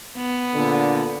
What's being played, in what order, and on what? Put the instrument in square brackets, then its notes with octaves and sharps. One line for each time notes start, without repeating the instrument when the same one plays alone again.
[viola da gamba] B3
[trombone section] A#2 D3